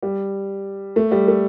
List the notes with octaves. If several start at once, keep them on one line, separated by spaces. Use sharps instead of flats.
G3
A3
G3
A3